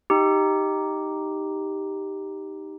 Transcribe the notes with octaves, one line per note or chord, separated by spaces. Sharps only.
D#4 G4